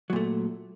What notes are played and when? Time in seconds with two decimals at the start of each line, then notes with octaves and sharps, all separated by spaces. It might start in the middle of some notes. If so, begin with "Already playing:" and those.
0.10 F#3
0.13 A#2
0.16 A3